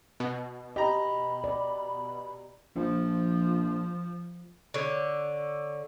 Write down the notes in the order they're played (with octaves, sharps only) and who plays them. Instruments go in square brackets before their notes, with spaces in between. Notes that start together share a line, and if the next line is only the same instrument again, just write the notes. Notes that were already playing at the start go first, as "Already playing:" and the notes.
[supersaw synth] B2
[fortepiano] G4 A#5 [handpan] D#5 [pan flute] B5
[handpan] D5
[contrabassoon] A#1 [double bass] F3
[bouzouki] D3 C#5